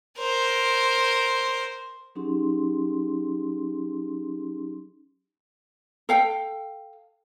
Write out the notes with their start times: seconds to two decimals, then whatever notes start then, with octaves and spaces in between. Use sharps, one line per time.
0.19 A#4 C5
2.15 F#3 C#4 D#4 G4 G#4 C6
6.09 A4 F5 G5